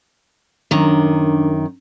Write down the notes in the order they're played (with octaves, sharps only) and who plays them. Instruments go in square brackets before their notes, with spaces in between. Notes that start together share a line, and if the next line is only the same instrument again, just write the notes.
[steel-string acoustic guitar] F#2 D#3 [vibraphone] D4